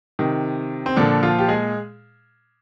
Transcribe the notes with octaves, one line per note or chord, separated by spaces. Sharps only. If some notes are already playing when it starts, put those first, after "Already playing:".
C3 D#3
C4
A#2 D3 F3 D4
F3 F4
G4
G#3 G#4